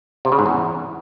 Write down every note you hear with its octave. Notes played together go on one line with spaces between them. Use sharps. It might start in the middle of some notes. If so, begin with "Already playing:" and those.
C3
C#3
G#2
E2